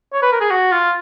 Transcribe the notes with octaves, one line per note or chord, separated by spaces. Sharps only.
C#5
B4
A#4
G#4
F#4
F4